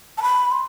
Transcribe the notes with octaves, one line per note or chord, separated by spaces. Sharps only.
A5
B5
C6